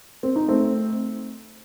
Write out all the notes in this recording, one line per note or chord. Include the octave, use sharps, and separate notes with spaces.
C4
D#4
A3 C4